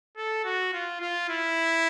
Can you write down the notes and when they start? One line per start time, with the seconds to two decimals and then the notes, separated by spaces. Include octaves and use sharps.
0.17 A4
0.44 F#4
0.73 F4
1.00 F4
1.30 E4